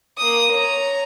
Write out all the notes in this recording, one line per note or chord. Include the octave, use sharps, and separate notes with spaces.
A#3 D#6
C#5 A#5